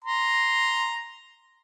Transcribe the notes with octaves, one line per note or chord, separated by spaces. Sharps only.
A#5 C6